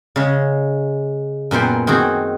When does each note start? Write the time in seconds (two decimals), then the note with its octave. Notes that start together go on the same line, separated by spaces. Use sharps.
0.16 C#3 G#3
1.51 F#2 A#2 B3 C5 G5
1.87 D#3 C4 F#4 G#4